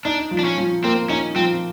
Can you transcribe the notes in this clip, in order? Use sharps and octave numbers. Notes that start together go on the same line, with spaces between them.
D4 D#4
F3
D4
C#4
F3
A#3 C4
C#4 D#4
F3 C4